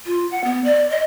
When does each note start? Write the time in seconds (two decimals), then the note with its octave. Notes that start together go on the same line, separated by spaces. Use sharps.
0.06 F4
0.31 F#5
0.44 B3
0.64 D5
0.90 D#5